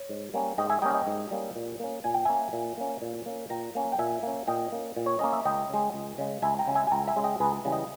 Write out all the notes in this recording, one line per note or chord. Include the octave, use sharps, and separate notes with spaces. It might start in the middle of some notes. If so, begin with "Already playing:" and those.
Already playing: C#5
G#2
G3 A#3 C#4
G#2 D#5 G5
E5 G#5
G3 A#3 C#4 D#5 G5
D#5 G5
G#2
G3 A#3 C#4
A#2
A#3 C#4
A#2 G#5
G5
A#3 C#4 E5 G#5
A#2
A#3 C#4
A#2
A#3 C#4
A#2 G5 A#5
A#3 C#4
G5
A#2 E5 G#5
A#3 C#4
A#2 D#5 G5
A#3 C#4
A#2
C#5
A#3 C#4 D#5
E5
C#2 D#5 G5
C#3 G#3
C#2
C#3 G#3
C#2 E5 G#5
G5 A#5
C#3 G#3
E5 G#5
G#5
C#2 G5 A#5
E5 G#5
C#3 G#3
D#5 G5
C#2 G#4 B4
C#3 E3 G3
D#5 G5